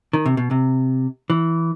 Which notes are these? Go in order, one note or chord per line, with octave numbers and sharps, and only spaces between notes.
D#3
C3
B2
C3
E3